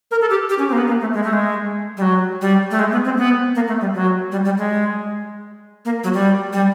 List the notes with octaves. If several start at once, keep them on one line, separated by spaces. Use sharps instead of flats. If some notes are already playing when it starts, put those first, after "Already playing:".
A#4
A4
G4
G4
C#4
C4
A#3
B3
A#3
A3
G#3
A3
G#3
G3
F#3
G3
A3
G#3
B3
C4
B3
A#3
A3
G3
F#3
G3
G3
G#3
A#3
F#3
G3
G3